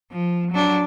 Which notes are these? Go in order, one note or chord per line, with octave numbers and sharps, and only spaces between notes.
F3
F#3 D4